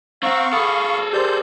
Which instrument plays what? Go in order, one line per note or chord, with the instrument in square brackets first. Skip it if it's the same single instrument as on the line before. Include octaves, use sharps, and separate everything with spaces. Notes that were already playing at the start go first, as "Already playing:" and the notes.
[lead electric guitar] C4 [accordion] F5 C#6 [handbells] F#5 A#5
[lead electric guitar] G#4 A4 [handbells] B5 D6 D#6
[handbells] G4 A#4 D5 [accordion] C5 G6